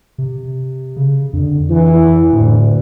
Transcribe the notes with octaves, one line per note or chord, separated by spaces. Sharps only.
C3
C#3
F2 D3
E3
D2 A2